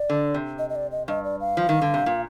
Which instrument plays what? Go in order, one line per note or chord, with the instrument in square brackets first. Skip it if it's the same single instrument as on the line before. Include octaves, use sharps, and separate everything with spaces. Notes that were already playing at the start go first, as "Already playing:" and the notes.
Already playing: [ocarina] D5
[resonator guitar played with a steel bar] D3
C3
[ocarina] D#5
D#5
D5
D#5
[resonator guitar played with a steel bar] G2 [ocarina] D#5
[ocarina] D5
F5
[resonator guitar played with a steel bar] F3
D#3
D3
C3
A#2